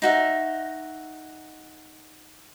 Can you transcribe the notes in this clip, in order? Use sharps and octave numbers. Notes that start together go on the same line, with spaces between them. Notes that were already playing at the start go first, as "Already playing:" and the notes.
D#4 F#4 E5